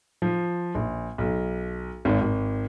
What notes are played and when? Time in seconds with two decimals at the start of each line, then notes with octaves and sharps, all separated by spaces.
0.22 F3
0.75 A#1
1.18 B1
2.05 G#1
2.21 G#1